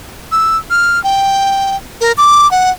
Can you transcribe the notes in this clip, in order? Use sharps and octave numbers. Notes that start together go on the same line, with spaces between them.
E6
F6
G5
A#4
D6
F#5